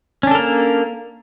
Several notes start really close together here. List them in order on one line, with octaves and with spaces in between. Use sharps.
C#4 D4 A4 A#4 A#3